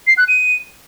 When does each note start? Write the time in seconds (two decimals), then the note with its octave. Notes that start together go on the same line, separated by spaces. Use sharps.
0.07 C7
0.18 F#6
0.28 D#7